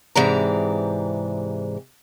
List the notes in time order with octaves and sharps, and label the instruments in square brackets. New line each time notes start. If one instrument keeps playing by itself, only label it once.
[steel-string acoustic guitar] G#2 C3 E3 D5 A#5